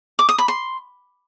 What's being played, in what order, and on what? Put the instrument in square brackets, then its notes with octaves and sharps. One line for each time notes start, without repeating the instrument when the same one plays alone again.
[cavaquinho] D6
D#6
B5
C6